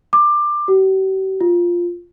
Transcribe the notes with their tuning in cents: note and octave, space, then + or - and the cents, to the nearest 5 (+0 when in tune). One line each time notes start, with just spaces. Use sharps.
D6 +20
G4 -45
F4 +0